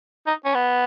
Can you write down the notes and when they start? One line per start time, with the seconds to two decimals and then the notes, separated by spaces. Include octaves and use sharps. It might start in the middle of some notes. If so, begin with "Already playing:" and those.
0.27 D#4
0.45 C#4
0.54 B3